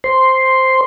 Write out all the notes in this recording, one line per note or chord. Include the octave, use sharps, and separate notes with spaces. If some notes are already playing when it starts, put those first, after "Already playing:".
C5 C6